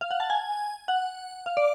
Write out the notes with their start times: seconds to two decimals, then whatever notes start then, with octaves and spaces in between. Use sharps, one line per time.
0.01 F5
0.11 F#5
0.20 A5
0.30 G#5
0.88 F#5
1.46 F5
1.57 D5